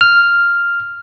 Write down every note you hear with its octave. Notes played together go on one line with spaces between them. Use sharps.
F6